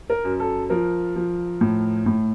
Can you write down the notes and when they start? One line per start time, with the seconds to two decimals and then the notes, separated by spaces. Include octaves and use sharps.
0.10 A#4
0.24 F#2
0.40 A4
0.70 F3 A#4
1.16 F3
1.61 A2
2.06 A2